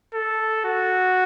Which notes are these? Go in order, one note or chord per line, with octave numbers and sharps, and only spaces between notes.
A4
F#4